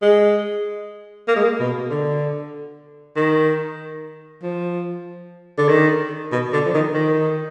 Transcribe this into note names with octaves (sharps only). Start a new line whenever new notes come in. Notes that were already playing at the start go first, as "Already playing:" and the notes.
G#3
A#3
G#3
A#3
B2
D3
D#3
F3
D3
D#3
B2
D3
F3
D#3
D#3